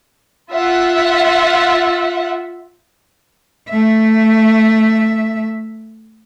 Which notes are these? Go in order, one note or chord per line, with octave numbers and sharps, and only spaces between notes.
F4 E5 F#5
A3 E5